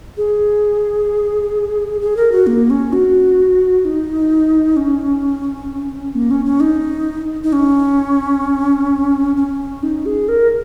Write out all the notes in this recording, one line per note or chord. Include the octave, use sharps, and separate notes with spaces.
G#4
G#4
A#4
F#4
A#3
C#4
F#4
D#4
C#4
A#3
C#4
C#4
D#4
D#4
C#4
C#4
D#4
G#4
A#4